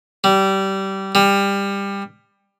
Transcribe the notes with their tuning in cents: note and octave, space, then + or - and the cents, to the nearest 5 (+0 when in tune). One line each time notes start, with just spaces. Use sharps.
G3 -20
G3 +20